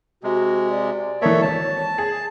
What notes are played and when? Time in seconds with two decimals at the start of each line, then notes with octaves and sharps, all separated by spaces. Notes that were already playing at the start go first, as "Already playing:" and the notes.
0.24 C3 G#3 F#4
0.71 D5
1.22 E3 A#3 A4 C#5 E5
1.42 G#1 C#5 A5 A6
1.98 G#4